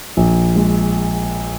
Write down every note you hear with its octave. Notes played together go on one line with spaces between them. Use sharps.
A#1
G#3